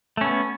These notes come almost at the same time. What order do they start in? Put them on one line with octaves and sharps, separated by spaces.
A3 C#4 B3